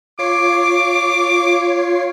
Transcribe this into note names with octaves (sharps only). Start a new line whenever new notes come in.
F4 C#5 D6 C7